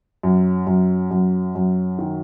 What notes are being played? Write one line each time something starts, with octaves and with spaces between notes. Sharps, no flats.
F#2
F#2
F#2
F#2
D#3